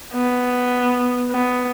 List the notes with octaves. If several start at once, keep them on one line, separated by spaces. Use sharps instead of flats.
B3
B3